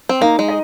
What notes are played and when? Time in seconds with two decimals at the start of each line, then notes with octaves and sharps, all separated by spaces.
0.09 C4
0.21 A#3 D#4
0.39 G#3
0.48 D#5